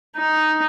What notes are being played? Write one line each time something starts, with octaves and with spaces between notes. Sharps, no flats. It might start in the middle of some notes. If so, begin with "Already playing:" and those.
D#4